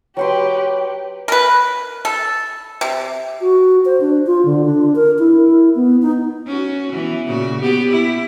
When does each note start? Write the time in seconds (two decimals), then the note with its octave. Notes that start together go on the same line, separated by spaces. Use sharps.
0.17 F#3 G4 B4 F#5 G5 C6
1.28 A#4 B4
2.05 A4
2.81 C3
3.41 F#4
3.85 C5
4.01 D4
4.26 F4
4.45 D3
4.65 D4
4.96 A#4
5.19 E4
5.75 B3
6.02 D#4
6.46 C#4 F#4
6.93 E3 B3
7.27 A#2 C#3 F#4
7.61 B3 G4
7.91 E4